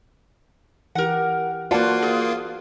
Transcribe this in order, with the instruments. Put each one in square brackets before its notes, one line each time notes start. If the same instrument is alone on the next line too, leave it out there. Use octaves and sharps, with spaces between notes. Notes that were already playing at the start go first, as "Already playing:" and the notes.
[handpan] E3 G4 [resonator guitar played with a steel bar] A#4 F#5
[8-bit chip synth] A#3 F4 [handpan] F#4 C5 D5 [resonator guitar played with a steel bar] B4 F#5 A5
[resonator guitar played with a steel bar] G#4